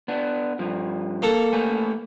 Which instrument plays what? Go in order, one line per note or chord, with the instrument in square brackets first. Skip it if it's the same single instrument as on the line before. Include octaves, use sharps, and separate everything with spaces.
[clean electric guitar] B3 D4
G2 F3
[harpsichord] A#3 A4 F#5
[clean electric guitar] A3 B4 G#5